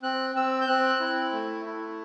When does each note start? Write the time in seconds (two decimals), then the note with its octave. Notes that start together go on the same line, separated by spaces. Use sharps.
0.02 C4 F#6
0.35 C4 E6
0.61 G6
0.67 C4 F#6
1.00 E4
1.32 A3
1.65 E4